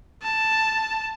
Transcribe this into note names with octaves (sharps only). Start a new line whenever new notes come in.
A5